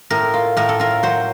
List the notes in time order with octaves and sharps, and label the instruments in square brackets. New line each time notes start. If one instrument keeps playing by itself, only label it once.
[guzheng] A2 A#4
F4
A2 A#4
A4
F4 A#4
F#3 C5